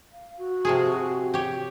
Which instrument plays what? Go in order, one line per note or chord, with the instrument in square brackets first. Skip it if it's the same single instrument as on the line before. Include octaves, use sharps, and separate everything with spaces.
[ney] F5
F#4
[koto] C3 F3 G#4
G4 C#5